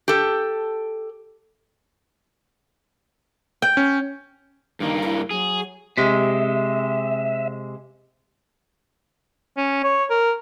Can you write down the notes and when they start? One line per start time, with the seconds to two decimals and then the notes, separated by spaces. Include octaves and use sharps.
0.08 G4 A4
3.62 G5
3.77 C#4
4.80 G2 D#3 A#3
5.03 E4
5.31 F#3 G#4
5.97 C3 G#3 E5
9.57 C#4
9.84 C#5
10.10 A#4